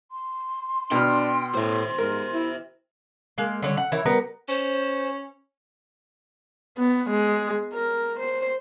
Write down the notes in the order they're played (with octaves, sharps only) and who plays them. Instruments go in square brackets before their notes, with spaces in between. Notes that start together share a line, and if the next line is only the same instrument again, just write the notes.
[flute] C6
[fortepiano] B2 F6 [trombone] D4 [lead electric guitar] G5
[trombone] A2 [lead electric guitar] C5 E5
[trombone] G#2 [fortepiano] A#4
[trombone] E4
[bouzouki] G#3 A#3
D3 G3 C#5
F#5
E3 E4 A#4 C#5
G3 B3 A#4
[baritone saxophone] C#4 [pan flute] C5
[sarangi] B3
G#3
A#4
C5